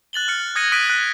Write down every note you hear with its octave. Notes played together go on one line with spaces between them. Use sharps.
F#6 A6 F#7 G7
F6 C#7
D#6 G#6 A#6 C#7 D#7
D#6 F#6 G#6 B6 D7 D#7
F#6 A#6